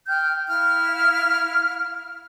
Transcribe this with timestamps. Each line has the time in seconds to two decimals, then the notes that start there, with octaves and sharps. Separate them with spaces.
0.08 G5 F6 G6
0.48 E4 F5 F6